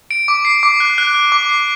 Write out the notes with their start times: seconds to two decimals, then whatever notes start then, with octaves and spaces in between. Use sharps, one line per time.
0.11 D7
0.28 D6
0.45 C7
0.63 D6
0.80 F#6
0.98 F#6
1.14 F#6
1.32 D6
1.49 C7